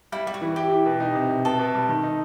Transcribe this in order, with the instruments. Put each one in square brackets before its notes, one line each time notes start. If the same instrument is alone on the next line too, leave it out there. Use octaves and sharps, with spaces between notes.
[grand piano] G3 [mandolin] E4
[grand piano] G3 [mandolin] E4
[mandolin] F#4
[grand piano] E3
[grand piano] E4 [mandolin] G4
[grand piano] E4
B2
D#4
C3
C3
[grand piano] B2 [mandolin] A4
[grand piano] B2
G3
D#3
D#4